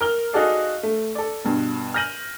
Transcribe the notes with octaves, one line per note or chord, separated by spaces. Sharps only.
A#4 F6 G7
D#4 F#4 G#4 A4 D5 F5
A3
A4 D5
G2 B2
F6 G6 A#6 D#7 F#7